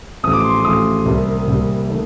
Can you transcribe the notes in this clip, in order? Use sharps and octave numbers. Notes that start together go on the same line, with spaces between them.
A1 A2 F3 A3 D#6
D6
C6
D6
A1 A2 F3 A3 D#6
C2 C3 G3 A#3
C2 C3 G3 A#3
D#3 A3